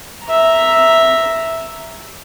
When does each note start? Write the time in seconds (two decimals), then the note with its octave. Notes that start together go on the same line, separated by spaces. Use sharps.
0.25 E5 A#5